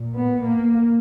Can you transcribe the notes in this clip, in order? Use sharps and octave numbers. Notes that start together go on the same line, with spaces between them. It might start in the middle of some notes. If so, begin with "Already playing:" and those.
Already playing: A#2
B3
A#3